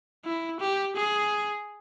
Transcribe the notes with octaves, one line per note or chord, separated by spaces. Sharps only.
E4
G4
G#4